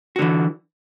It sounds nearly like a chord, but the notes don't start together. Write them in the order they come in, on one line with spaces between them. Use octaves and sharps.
F#4 D3 E3